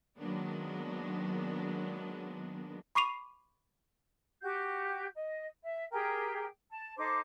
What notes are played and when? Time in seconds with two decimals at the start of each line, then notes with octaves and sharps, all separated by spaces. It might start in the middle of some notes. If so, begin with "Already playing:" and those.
0.18 D#3 F#3 G#3 A#3 B3 D4
2.95 B5 C#6 D6 C7 D#7 F7
4.41 F#4 G4 G6
5.14 D#5
5.64 E5
5.91 G4 G#4 A#4 G5
6.71 A5
6.97 D#4 A4 C5 D6